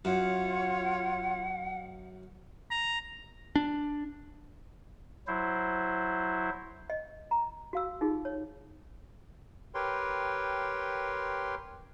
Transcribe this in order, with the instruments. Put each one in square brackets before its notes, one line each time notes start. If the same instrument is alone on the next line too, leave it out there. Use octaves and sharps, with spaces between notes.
[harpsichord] F#2 [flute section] F4 C#5 [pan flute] F#5
[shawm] A#5
[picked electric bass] D4
[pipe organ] F#3 E4 C5
[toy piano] D#5
A#5
F#4 F5 E6
D#4 F4 G4 G#4
C#5
[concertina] G4 A#4 B4 C#5 G5 C6